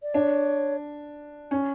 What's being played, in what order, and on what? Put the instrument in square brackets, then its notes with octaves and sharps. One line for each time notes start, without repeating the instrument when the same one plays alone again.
[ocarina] D5
[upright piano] D4 [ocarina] C#5
[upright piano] C#4